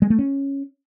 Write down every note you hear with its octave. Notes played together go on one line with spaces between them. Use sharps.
G#3
A3
C#4